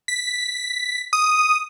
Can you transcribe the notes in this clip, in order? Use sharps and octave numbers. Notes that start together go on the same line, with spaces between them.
B6
D#6